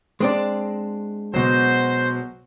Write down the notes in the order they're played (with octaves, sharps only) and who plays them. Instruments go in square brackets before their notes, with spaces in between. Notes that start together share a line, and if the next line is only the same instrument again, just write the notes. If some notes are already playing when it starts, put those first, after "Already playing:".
[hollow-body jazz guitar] G#3 C4 D4
[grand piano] B2 F#3 [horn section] C5